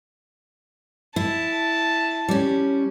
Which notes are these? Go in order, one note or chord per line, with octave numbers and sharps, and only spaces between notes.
E4 A5
G3 C#4